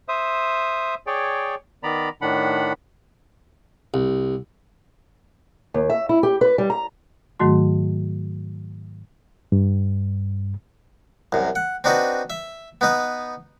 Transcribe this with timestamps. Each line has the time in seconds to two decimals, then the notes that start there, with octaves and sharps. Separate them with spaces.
0.08 C5 E5 D#6
1.07 G#4 C#5 D5 G5
1.83 D#3 B3 D5 A#5 B5
2.21 A2 D#3 D4 F#5 B5
3.94 C2
5.74 D#2
5.90 E5
6.09 E4
6.23 G4
6.41 B4
6.58 G3
6.70 A#5
7.40 G#2 D#3 F#3 A3 F#4 C6
9.52 G2
11.32 C2 F#2
11.55 F#5
11.84 C4 D4 D#4 F#4 B4
12.30 E5
12.81 B3 D#4 B4